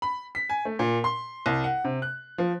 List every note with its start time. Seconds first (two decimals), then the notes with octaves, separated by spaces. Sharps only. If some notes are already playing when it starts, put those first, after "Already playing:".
0.02 B5
0.35 B6
0.49 G#5
0.65 A3
0.79 A#2
1.04 C6
1.46 C2
1.64 F#5
1.84 C3
2.02 F#6
2.38 F3